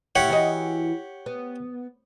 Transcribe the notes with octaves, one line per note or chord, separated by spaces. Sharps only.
A2 E4 G4 C#5 F#5
E3 F#4 D#5
B3